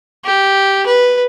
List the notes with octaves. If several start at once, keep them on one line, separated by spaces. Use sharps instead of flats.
G4
B4